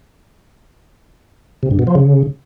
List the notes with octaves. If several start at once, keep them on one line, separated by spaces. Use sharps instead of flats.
C3
G2
B2
F3
C#3